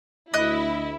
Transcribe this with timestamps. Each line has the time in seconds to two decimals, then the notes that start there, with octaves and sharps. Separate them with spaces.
0.34 D2 E4 D#5 F#6